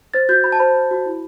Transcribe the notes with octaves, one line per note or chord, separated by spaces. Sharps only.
C5 A6
F#4 G6
F#4 B5
A5
C5 B5
C5
F#4
E4